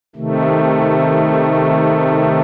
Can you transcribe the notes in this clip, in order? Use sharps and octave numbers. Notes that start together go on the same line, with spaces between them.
C3 D#3 A3